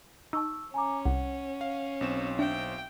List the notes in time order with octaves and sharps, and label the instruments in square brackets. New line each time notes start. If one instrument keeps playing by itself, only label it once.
[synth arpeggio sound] D#4 [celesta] A5 C#6 E6
[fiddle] C#4 [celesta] G#5 A#5 D6
[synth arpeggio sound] C2 [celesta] F#5
[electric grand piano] F5
B1 C4 E7
[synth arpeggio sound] D4 [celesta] E5 [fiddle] G5